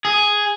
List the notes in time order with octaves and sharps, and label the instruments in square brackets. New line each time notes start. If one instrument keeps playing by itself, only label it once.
[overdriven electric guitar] G#4